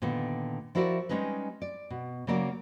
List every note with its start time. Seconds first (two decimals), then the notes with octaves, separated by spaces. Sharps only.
0.02 A#2 D3 D#3 B3
0.75 F3 E4 F#4 A#4 C5 D5
1.09 G3 G#3 C#4 D#4 B4
1.62 D5
1.90 B2
2.27 C#3 F#3 A#3 A#4 D5